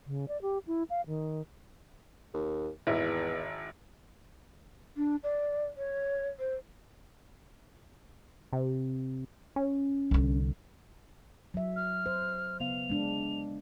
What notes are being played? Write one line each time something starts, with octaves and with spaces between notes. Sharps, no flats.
C#3
D5
G4
E4
F5
D#3
D#2
G#1 E2 E4
D4
D5
C#5
C5
C3
C#4
C2 D3
F#3 E5
F6
C5
C#3 B3 F5 F7
G#3 D4